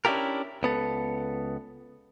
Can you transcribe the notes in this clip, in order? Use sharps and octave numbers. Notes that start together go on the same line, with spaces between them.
C#4 D4 E4 F4 G4 A#4
C#2 B3 A4